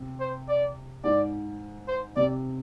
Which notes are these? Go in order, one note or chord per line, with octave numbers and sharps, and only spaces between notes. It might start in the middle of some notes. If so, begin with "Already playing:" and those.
Already playing: C3
C5
D5
G#2 D5
C5
C3 D5